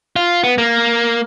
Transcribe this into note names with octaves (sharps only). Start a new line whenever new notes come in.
F4
B3
A#3